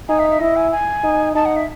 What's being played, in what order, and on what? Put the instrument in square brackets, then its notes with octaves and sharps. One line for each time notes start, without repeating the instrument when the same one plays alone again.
[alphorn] D#4 [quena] G#5
[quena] E5
E5
[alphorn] E4 [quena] D#5
[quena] G#5
G#5
[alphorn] D#4
[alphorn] D#4 [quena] A5
[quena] F#5
E5